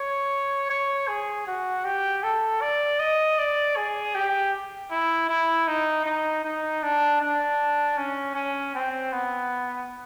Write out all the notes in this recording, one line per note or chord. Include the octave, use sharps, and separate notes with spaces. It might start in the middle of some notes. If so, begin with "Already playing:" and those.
Already playing: C#5
C#5
G#4
F#4
G4
A4
D5
D#5
D5
G#4
G4
E4
E4
D#4
D#4
D#4
D4
D4
C#4
C#4
C4
B3